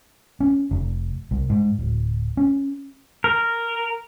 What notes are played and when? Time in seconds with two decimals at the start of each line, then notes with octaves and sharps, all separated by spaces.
0.40 C#4
0.71 F1
1.31 C2
1.50 G#2
1.79 D1
2.37 C#4
3.24 A#4